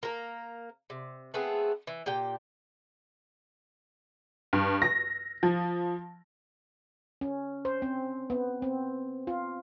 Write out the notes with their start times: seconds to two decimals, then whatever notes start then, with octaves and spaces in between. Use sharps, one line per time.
0.03 A#3 A#4
0.90 C3
1.34 A3 B3 C4 G#4
1.87 E3
2.06 A#2 G4 G5
4.53 G2
4.82 A#6
5.43 F3
7.21 C#4
7.65 C5
7.82 C4
8.30 B3
8.62 C4
9.27 F4